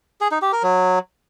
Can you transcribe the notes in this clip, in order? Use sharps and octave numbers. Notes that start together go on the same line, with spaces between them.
G#4
D#4
G4
A#4
F#3